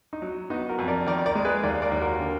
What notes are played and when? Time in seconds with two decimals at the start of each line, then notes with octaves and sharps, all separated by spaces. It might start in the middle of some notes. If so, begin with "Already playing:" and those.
0.13 D#4
0.22 F#3
0.50 B3 D#4 F#4
0.69 F#4 A#4
0.79 F2
0.88 A#4 D5
1.07 D#3 A#4 D5
1.26 A#4 D5
1.35 G#3
1.45 G#4 B4
1.63 D#2 A#4 D5
1.82 A#4 D5
1.92 D#2
2.01 F#4 A#4
2.20 D3